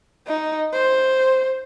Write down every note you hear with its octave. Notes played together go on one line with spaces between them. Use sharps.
D#4
C5